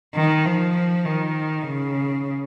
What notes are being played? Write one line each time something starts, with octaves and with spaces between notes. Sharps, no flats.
D#3
F3
D#3
C#3